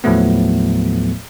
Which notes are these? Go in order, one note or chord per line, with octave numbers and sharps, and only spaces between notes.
D#2 A2 F3 F#3 A3 B3